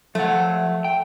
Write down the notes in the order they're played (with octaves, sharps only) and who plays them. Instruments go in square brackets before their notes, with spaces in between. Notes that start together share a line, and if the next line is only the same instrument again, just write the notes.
[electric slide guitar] F3 F#5 [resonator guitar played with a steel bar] A3
[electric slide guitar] G5